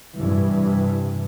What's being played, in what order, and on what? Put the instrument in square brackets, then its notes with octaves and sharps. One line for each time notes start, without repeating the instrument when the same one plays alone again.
[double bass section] G2 C3 E3